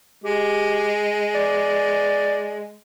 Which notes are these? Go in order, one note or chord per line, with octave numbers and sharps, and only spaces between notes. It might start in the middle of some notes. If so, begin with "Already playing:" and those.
G#3 G4
D5